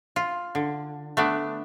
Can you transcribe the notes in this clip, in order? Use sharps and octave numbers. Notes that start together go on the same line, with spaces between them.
F4
D3
A3 B3 D4